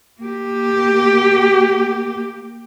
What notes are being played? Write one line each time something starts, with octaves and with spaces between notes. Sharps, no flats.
A#3 G4